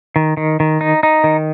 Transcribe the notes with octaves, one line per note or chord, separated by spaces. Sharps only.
D#3
D#3
D#3
D#4
D#4
D#3